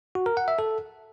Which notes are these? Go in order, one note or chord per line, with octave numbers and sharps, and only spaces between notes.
F#4
A#4
F#5
E5
A4